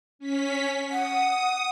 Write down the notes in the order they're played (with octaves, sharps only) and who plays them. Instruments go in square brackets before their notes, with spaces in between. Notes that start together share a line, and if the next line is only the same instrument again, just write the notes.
[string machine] C#4 B6
[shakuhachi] F#5 [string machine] D#6